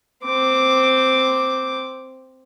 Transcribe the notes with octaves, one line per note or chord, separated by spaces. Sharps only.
C4 D6